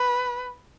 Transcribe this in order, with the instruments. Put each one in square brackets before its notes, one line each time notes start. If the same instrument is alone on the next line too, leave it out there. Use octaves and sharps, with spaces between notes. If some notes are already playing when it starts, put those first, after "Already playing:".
Already playing: [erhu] B4